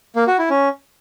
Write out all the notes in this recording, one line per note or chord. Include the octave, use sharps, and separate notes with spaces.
A#3
F#4
E4
C#4